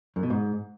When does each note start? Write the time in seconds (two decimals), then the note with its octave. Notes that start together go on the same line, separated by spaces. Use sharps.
0.16 F#2
0.23 B2
0.30 G#2